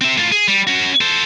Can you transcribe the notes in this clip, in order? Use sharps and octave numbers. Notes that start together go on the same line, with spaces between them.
C4 E5
A2 F4
G#4
G3
C#4 F#4
A4 C5